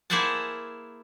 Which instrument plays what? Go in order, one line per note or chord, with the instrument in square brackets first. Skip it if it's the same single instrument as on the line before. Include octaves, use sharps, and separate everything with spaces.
[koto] A#3 E4 G#4 C5 F#5 A5